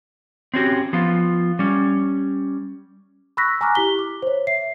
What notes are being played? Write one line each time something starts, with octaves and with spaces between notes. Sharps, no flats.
C4 C#4 F#4 G4
F3 B3 F4
G3 C#4
B5 C#6 E6 F#6 A#6 B6
G#5 A#5 C#6 D6 F6 F#6
E4 G4 B6 G7
D6
C5 C#5
E5 C7